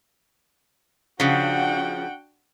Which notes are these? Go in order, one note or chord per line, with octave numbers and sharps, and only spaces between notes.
C#3 F3 D4 F#4 F#5 G5